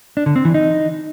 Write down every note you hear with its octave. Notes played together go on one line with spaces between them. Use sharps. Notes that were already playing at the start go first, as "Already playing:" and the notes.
D4
D3
C4
E3
D#4